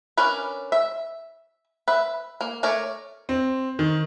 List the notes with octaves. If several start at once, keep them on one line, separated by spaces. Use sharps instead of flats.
C#4 D4 A#4 B4
E5
B4 E5
A#3
A3 A#4 C#5 D5
C4
D#3